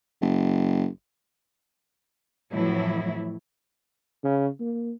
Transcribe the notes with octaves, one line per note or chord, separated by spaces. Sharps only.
F#1
F2 A2 E3 F#3 E4
C#3
A#3